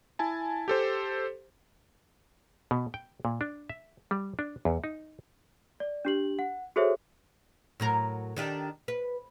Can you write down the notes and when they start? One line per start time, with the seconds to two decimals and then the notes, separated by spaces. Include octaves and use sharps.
0.19 E4 G#5 A5
0.68 G4 A4 C5
2.71 B2
2.94 G5
3.25 A#2
3.41 D4
3.70 E5
4.11 G3
4.39 D4
4.65 E2
4.84 D#4
5.80 D5
6.05 D4 G4 F#7
6.39 F#5
6.76 F#4 G#4 A4 C5 C#5 E5
7.80 A2 F#3 A#4
8.36 D#3 D4 G4
8.88 B4